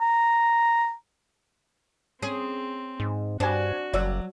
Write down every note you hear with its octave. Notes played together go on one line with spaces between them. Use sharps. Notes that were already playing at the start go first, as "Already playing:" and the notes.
A#5
C4 C#4 G#4
G#2
G2 D4 F#4 C5 G#5
F#1 F#3 D5 E6